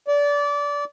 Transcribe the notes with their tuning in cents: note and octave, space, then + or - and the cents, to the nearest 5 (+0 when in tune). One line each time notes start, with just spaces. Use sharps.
D5 -25